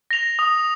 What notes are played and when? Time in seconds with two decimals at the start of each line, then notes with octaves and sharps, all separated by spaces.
0.11 A#6 F7
0.39 D#6